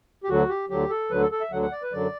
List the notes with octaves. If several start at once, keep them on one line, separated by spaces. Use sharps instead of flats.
G4
D2 D3 F#3 F#4
G4
D2 D3 F#3 G4
A4
D2 D3 F#3 B4
A4
A4
E5
D2 D3 F#3 F#5
F#5
D5
B4
F#2 D3 F#3 D5